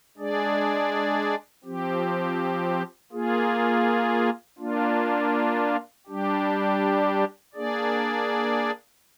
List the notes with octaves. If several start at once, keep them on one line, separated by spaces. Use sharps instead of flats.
G#3 D4 G#4 D5
F3 C4 G4
A#3 F4 G#4
A#3 D4 F4
G3 D4 G4
A#3 D4 G#4 D5